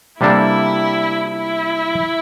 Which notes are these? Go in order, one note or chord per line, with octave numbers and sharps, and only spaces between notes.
C3 G3 A#3 D4 E4 A4
E4